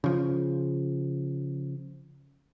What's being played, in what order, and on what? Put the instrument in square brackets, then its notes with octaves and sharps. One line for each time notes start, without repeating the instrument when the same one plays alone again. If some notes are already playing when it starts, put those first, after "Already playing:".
[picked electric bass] C#3 F3